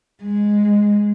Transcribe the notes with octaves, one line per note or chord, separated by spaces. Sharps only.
G#3